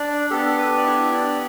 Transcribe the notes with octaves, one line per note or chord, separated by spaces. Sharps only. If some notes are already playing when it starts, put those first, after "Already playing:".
Already playing: D4 D5
B3 D4 G4 A4
A4
B4
D5
E4 E5
D4 D5